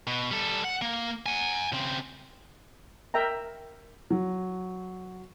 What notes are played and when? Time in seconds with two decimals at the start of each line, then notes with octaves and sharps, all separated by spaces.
0.07 B2
0.31 G3 A4
0.64 F#5
0.82 A#3
1.26 F#5 G#5
1.72 C#3 C4
3.14 A#4 E5 G5 A#5
4.10 F#3